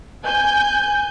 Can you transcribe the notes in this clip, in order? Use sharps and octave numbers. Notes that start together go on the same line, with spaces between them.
G#5 G6